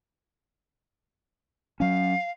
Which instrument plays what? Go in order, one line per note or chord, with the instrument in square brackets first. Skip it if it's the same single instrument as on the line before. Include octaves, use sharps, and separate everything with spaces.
[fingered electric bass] F#3 C#4 [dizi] F5